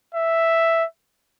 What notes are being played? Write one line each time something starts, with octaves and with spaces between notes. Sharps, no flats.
E5